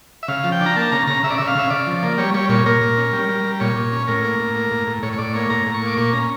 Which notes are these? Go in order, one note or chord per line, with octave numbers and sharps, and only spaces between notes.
E5
C#3 F5
F3
G5
D4
A#5
A#3 A5
C#3 A#5
C#3 A#5
C#3 E5
D5
C#3 E5
F5
C#3 E5
C#3 D5
F3
A#3
G3 C#5
G3 C#5
A#2 C#5
A#2 A#4
A#2
C#4
G3
G3
G3
A#2 C#5
A#2
C#4
A2 A#4
A#3
A2
A#3
A2
A2
A2 C#5
C#5
A2 D5
A#3 C#5
A2 A#5
A2
C#6
A#3
D6
A#2 C#6
C#4 A#5